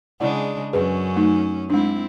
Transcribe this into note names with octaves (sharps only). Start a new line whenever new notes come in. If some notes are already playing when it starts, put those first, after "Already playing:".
C#3 G#3 D4 E4 D5 F#5
F#2 C#4 G#4 B4
A3 D#4
G#3 C4 D4 E4